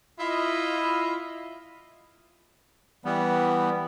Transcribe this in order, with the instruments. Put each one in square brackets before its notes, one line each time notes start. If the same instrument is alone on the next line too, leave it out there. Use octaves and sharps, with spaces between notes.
[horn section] E4 F4 D#5
[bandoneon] E3 G3 B3